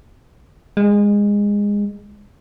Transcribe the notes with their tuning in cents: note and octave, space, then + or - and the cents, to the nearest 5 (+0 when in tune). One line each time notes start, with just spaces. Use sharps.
G#3 -20